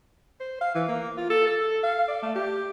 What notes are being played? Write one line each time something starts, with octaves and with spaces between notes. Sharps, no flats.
C5
F5
E3
A#3
F4
A4
A4
F5
D5
A3
G4